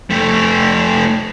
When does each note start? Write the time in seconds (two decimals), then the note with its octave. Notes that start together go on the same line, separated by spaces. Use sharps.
0.10 F2 A3